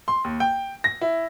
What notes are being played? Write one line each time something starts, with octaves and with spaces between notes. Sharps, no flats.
C6
D#2
G5
A#6
E4